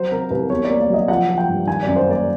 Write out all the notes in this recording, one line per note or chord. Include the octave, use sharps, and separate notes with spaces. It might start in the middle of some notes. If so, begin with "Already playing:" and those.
Already playing: F#3 C5
C3 A#4
C2 B4
E2 C#5
D5
A#3
D5
F#3 D#5
F3 F#5
F3
G5
G2
D#3 G#5
F#2 D5
C5
A#3 D5